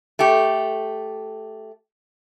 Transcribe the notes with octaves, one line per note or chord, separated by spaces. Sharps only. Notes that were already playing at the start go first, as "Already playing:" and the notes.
A3 G4